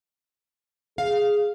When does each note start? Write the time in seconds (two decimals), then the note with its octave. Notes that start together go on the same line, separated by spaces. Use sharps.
0.98 G#4 F5